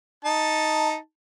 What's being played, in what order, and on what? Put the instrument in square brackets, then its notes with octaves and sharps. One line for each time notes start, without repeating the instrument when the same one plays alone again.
[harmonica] D#4 A5